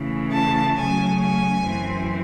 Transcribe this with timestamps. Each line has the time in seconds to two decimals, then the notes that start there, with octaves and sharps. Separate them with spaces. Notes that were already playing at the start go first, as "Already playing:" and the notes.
Already playing: C#3 E3 A3
0.34 A5
0.77 C#3 F#3 A3 C#4 G#5
1.21 G#5
1.64 F#2 E3 C4